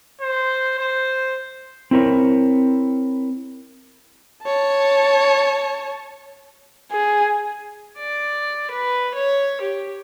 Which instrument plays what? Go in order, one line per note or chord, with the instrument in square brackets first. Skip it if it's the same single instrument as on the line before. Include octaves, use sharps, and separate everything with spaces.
[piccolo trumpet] C5
C5
[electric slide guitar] C4 E4 A#4 C#5
[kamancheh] C#5 A5
G#4
[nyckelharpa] D5
B4
C#5
G4